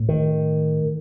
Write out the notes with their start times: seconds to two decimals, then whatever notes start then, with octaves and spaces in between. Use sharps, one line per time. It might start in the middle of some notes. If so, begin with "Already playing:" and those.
Already playing: A2
0.09 D#3